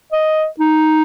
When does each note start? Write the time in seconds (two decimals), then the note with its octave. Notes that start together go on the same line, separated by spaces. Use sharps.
0.13 D#5
0.60 D#4